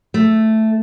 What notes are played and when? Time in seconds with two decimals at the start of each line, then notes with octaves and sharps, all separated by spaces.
0.14 A3